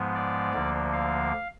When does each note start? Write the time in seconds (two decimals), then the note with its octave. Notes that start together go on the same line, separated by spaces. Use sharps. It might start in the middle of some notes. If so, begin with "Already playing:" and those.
Already playing: G#2 F3 G#3 B3
0.15 D5
0.53 D2 D3 F3 A#3
0.93 F5